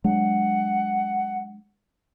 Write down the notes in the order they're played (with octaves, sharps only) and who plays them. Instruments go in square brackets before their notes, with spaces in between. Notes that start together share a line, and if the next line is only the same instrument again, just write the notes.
[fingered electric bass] F#3 G#3 D4 [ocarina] F#5